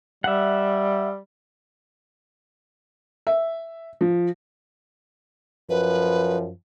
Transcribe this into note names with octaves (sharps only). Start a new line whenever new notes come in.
G3 E5 F#5
E5
F3
F#2 F3 B4